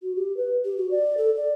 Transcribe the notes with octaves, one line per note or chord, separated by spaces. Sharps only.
F#4
G4
B4
G4
F#4
D5
A4
D5